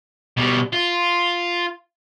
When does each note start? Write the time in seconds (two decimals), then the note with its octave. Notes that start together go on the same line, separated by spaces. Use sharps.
0.37 B2 G3
0.73 F4